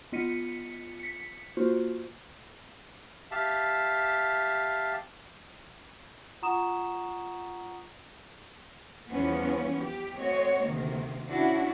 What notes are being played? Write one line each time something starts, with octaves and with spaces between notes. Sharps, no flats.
B3 F4 D#5 B6 C#7 D#7
B6 C#7
A#3 F4 F#4 C5
G4 E5 F5 A5
F4 F#5 A#5 C#6 D#6 E7
E2 F3 G3 B3 C#4
G4
A3 C4 F#4 C#5 D#5
D2 C3 D#3 A#3
C#4 D4 E4 F#4